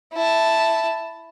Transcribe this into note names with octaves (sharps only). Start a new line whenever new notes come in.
E4 A5